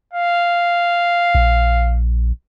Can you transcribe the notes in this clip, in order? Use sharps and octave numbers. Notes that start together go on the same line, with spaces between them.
F5
A#1